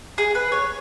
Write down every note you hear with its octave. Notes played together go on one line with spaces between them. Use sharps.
G#4
B4
C#5